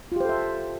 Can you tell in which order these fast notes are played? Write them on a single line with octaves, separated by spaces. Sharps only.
F4 G4 C5 A4 E5